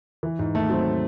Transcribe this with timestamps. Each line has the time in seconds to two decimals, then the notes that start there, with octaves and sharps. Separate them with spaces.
0.23 E3
0.39 G#2
0.54 D#2 A3
0.69 F#3 C4